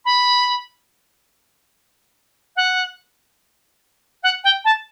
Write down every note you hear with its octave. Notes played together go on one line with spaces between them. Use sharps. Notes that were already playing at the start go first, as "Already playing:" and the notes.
B5
F#5
F#5
G5
A5